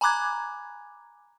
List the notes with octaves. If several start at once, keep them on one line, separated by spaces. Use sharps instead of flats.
G#5 A#5 B5 D6 F#6 G#6